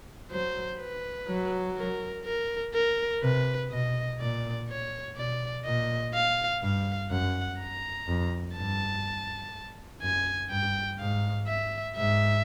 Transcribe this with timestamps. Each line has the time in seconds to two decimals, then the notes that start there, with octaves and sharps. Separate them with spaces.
0.31 F#3 C5
0.80 B4
1.29 F#3
1.77 A#4
2.25 A#4
2.74 A#4
3.23 C3 B4
3.71 B2 D#5
4.20 A#2 D5
4.68 C#5
5.16 B2 D5
5.65 A#2 D#5
6.14 F5
6.62 G2 F5
7.10 F#2 F#5
7.59 A#5
8.08 F2
8.56 G2 A5
10.02 F#2 G#5
10.50 G2 G5
10.99 G#2 F5
11.47 E5
11.96 G#2 E5